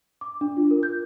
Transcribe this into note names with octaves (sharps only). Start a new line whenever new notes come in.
D6
D4
F4
A#4
G6